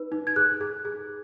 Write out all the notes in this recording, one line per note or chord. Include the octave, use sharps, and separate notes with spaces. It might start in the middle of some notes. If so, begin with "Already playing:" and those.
Already playing: D#4 B4
D#4
G#6
G#4 F#6
G#4
G#4